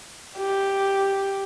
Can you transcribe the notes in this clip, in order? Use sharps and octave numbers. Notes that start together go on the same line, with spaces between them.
G4